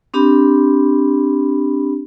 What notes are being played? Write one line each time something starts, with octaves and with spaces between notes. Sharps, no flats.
C4 D4 G4 B5